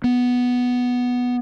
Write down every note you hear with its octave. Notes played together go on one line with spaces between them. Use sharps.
B3